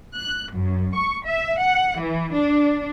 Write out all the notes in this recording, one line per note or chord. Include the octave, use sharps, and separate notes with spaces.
F#6
F#2
C#6
E5
F#5
E3
D4